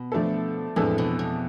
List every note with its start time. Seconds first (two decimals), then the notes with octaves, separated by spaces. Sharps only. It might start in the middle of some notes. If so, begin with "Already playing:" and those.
Already playing: B2
0.12 F3 A3 D4 A4
0.76 F2 A2 E3 G#3 D4 A4
0.98 B2
1.19 B2